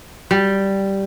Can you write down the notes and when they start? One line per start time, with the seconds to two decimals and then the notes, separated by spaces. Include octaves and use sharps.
0.31 G3